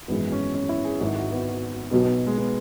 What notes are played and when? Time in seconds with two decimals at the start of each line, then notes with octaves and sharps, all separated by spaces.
0.08 G#1 F#2 E3 G#3 B3
0.32 C#4
0.55 C#4
0.69 E4
0.84 G#4
1.00 G#1 G#2 F#3 E4 F#4
1.15 F#4
1.31 B3
1.91 B1 B2 F#3 B3
2.03 B3
2.27 G#3
2.38 B3